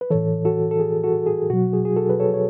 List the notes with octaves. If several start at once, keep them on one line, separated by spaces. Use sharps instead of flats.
B4
A2 E3 A4 C#5
F#4 A4
A4
G#4
F#4 A4
G#4
B2 F#3 F#4
G#4
G#4
F#4 A4
B4
A4 C#5
C#5